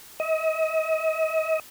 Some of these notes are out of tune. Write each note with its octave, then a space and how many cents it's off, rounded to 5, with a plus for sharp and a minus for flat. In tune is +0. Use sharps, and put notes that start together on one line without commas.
D#5 +40